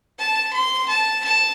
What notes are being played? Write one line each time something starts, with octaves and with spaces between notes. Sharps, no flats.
A5
C6
A5
A5